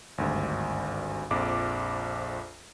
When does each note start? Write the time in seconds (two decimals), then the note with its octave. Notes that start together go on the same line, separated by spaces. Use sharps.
0.18 G#1 D2 G2
1.31 A#1 F2 D6